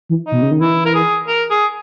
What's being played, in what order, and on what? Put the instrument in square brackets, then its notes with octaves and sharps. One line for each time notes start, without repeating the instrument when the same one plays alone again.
[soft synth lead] E3
[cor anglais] D#4
[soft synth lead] B2
C#3
D#3
[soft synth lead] E3 [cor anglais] E4
[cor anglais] A#4
G#4
A#4
G#4